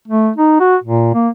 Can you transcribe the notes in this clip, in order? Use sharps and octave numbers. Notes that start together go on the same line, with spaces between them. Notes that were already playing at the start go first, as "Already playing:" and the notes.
A3
D#4
F#4
A#2
A#3